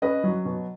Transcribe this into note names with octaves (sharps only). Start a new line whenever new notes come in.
C#4 B4 D#5
F#3
B2